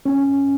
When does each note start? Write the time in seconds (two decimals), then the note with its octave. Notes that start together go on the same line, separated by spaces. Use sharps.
0.06 C#4